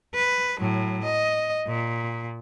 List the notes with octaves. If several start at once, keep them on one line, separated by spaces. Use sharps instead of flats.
B4
A2 F#3
D#5
A#2